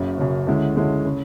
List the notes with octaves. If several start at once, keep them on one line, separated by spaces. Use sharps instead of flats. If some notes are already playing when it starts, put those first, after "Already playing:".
Already playing: F#1 F#2 C#3
F#1 F#2 C#3
D2 D3 G#3 C#4 E4
D2 D3 G#3 C#4 E4
C#3